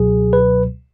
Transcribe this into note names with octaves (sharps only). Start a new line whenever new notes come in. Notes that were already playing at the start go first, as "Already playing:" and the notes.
Already playing: C#2 B2 F#3 G#4
B4